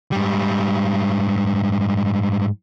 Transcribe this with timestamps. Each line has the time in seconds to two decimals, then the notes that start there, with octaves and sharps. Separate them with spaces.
0.12 G#2 G3